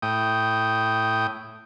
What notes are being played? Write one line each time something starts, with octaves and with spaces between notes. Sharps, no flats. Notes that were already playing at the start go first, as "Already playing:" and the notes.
A2 G5 D#6